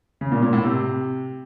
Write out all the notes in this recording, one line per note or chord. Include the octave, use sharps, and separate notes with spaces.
C#3
A#2
A#2
A2
C3